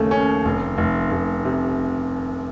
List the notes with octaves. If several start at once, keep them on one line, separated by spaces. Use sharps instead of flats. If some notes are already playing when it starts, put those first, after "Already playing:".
Already playing: D#2 C#3 A3
C#4
F1
F1
F1
C3